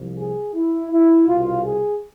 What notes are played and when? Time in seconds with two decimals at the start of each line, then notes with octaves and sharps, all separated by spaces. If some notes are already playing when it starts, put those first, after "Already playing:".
Already playing: C2 C3 F3
0.19 G#4
0.55 E4
0.92 E4
1.28 C2 B2 F4
1.64 G#4